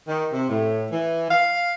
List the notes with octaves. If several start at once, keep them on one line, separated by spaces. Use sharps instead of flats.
D#3
C3
A2
E3
F5